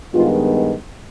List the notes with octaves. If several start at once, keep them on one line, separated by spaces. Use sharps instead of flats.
G2 D#3 G#3 B3 F4